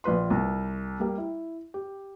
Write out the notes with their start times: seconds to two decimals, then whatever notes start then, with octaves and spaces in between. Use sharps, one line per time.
0.04 A#1 F4 B4 C6
0.30 C2
1.00 G3 A#3
1.18 E4
1.74 G4